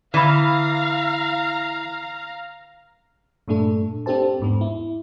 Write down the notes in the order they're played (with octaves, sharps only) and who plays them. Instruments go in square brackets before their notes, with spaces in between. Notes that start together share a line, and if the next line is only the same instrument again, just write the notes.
[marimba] D3 B5 [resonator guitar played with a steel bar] E3 [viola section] F5 A#5
[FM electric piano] G2 A#2 A3 D4 A4
C4 D4 G4 A4 C5 A5
E2 G#2 B3
E4